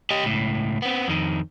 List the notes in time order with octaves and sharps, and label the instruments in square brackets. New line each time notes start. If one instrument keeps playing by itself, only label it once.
[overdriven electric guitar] G4 D#5
C#2 A2
B3 C4
F2 D#3